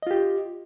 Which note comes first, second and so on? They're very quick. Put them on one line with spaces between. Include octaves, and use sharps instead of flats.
D#5 F4 G4